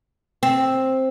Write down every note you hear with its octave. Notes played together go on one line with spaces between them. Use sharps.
C4